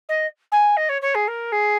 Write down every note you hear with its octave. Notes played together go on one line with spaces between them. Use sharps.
D#5
G#5
D#5
C#5
C#5
G#4
A#4
G#4